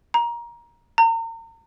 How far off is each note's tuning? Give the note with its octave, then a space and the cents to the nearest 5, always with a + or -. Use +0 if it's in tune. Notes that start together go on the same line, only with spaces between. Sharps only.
A#5 +20
A#5 -35